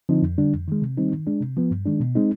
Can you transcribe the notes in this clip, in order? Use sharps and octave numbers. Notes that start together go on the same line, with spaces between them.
D3 F3 C4 D#4
F2
D3 G3 D4
F2
D#3 G#3
C3
D#3 G3 C4 D#4
D#3
G#3 D4
C3
F3 B3
G2
D#3 G#3 D4
B2
G#3 C4 D#4